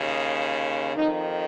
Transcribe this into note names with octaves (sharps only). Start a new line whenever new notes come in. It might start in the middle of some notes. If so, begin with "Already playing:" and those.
Already playing: D#2 C#3
F2 D#3 D#4